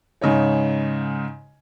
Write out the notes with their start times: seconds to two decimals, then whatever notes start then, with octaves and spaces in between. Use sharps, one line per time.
0.21 G#2 C#3 D#4 C#5